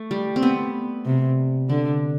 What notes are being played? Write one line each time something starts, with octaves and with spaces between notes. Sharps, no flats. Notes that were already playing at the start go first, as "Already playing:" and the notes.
Already playing: A3
G3
C4
B3
C3
D3 D4